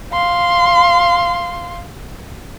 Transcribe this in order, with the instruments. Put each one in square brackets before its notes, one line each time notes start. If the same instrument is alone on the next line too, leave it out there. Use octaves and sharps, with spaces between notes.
[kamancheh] F5 C6